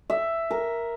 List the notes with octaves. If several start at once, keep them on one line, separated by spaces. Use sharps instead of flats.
E5
A#4